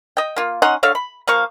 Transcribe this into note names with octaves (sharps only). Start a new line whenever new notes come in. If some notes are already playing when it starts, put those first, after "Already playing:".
D#5 G5
A#3 F4
C#4 D#4 F#5 C6
D3 A4 C#5 F5
B5
F3 A#3 F5 C#6